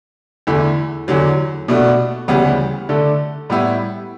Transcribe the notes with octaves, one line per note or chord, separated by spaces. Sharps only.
E2 D3 A3 E4
E2 D3 F#3
B2 A3 D4 F#4
D2 C#3 E3 G3 B3
D3 A3 D4 A4
A2 G3 B3 E4